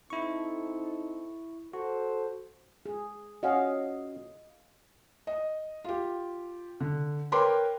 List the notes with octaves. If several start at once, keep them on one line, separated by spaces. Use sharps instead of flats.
C4 D#4 E4 A4 C#6
F#4 A4 C5
G#4
C#4 F#4 D#5 F5
D#5
F4 G4
D3
A#4 B4 C#5 G5 C6 D6